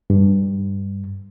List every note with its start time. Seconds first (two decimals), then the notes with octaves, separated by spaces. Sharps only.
0.10 G2